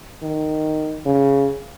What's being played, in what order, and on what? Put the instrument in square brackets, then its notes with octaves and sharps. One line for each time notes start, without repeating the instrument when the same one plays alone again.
[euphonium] D#3
C#3